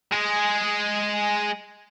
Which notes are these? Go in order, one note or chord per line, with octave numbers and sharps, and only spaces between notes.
G#3 G#4